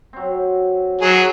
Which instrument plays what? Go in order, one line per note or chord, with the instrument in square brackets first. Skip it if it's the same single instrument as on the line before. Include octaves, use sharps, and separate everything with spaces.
[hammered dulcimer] F#3 C4
[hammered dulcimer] D#3 [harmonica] F#3 G#4